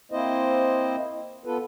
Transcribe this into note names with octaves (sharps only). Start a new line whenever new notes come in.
A#3 C4 E4 C5 D#5
B3 F4 A4 B4